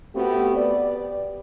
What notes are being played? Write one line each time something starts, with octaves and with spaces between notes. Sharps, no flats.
A3 B3 C4 F#4 G4
B3 G4 D5